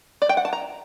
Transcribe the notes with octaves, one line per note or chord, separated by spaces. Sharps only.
D5
G5
F#5
A5
A#5